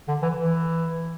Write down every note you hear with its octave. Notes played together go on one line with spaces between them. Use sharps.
D3
E3
E3